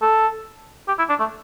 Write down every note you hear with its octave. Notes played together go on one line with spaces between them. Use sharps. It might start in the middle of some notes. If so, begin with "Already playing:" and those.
A4
G4
E4
D4
A3